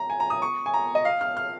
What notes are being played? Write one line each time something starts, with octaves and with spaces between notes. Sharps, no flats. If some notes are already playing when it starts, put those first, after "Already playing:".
Already playing: A#5
G#5
A#5
D#6
C#6
G#5
A#5
D#5
F5
F6
F6